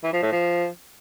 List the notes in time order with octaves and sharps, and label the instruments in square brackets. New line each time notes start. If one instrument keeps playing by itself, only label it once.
[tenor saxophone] E3
F3
A2
F3